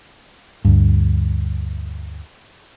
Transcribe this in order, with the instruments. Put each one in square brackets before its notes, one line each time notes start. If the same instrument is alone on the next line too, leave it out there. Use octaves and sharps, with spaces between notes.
[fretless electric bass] D2 G2